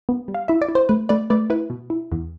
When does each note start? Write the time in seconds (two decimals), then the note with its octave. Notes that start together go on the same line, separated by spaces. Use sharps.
0.09 B3
0.28 G3
0.34 F5
0.48 E4 E5
0.61 D5
0.69 E4
0.75 C5
0.89 A3 B4
1.09 A3 B4 D5
1.30 A3 B4 D5
1.50 E4 B4
1.70 B2
1.90 E4
2.12 E2